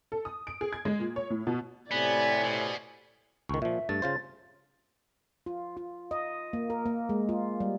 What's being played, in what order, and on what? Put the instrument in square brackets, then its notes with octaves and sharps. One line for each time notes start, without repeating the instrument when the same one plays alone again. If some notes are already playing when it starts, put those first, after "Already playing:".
[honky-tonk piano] A4
D#6
D7
G#4
G#6
G#3
A#2
C#5
A2
B2
[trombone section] A2 C3 [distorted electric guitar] B3 [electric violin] D5 G#5
[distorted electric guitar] B2
[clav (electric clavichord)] C#2 D#3 [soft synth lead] C#6
[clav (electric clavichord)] A#2 F3 [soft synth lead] E5
[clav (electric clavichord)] G2 A3 [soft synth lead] A6
[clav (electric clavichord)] C#3 F4 C5
[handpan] F4
F4
D#5
A#3
A#4
A#3
G#3
F4
G3